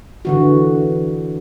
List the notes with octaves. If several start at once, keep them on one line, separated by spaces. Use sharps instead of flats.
D3 E3 F#4